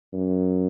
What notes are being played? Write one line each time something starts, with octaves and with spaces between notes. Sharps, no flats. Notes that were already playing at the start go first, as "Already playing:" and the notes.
F#2